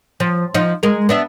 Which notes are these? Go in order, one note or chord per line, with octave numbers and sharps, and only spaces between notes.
F3
F3 D#4
G#3 A#4
B3 D4 E5